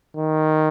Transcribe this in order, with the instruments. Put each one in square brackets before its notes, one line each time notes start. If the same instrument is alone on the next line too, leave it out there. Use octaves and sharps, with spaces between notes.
[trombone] D#3